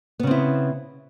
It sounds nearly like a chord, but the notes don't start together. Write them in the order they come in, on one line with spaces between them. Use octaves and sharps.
B3 C#3 C4 E4